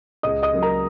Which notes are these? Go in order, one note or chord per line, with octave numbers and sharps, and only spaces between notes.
C#2 D#5 D#6
D#5 D#6
C#3 F#3 A#3
A#4 A#5